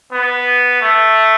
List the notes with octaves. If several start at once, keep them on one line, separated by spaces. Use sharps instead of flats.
B3
A3